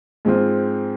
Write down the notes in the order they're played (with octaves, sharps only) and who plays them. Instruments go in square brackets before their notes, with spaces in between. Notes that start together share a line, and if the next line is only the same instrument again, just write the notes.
[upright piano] G#2 F3 G#3 C4 F4